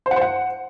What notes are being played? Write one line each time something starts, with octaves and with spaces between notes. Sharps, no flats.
C5
F#5
C5
F#5